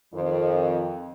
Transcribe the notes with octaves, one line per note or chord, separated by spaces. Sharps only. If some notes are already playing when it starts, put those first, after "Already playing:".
F2 D#3